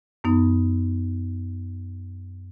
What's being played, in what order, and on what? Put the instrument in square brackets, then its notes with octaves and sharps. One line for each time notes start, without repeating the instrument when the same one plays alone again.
[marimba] F#2 B3 D#4